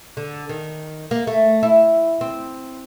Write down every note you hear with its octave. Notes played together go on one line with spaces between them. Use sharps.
D3
D#3
A#3
A3
E4
C4